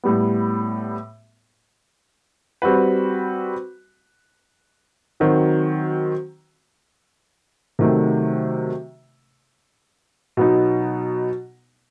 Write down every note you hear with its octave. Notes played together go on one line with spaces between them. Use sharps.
A2 G3 B3
G3 C4 F#4 B4
D#3 F#3 C4 F#4
C3 D#3 F#3 A3
B2 F#3 B3 D#4